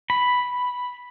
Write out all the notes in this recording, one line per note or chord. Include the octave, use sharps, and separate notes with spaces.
B5